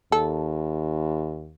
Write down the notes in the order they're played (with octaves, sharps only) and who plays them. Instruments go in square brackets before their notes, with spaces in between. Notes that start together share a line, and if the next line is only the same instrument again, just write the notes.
[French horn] D#2 [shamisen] A4